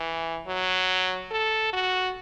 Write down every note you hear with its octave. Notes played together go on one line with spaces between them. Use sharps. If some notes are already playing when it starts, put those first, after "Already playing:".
Already playing: E3
F#3
A4
F#4